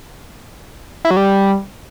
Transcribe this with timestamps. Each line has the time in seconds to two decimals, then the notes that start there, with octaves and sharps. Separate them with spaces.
1.05 E4
1.11 F#3
1.17 G3